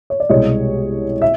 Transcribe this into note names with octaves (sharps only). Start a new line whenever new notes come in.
C#5
D5
C2 B2 G#3 C#5 D#5
E5